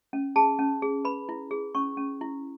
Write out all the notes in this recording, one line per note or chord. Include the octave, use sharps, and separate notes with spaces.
C#4
G#4 A5
C#4
G#4
B4 B5
E4
G#4
C#4 C#6
C#4
E4